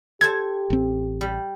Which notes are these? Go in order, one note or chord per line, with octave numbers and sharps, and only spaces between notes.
G4 A4 C5 A5 G#6
A1 C4
G3